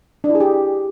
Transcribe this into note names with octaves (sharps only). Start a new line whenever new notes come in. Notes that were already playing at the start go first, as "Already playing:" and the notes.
D4
E4
G#4
G4